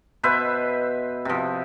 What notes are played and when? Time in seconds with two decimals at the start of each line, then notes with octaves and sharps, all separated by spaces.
0.23 B2 B4 C5 E5
1.25 C3 F3